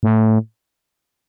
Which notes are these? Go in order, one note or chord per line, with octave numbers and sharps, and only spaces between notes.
A2